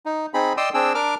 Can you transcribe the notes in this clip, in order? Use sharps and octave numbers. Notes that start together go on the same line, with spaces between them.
D#4
C4 D#4 G#4 B5
D5 D#5 G5 C6 D#6 E6
C4 D4 G#4 G5 E6
D4 A#4 D6 F6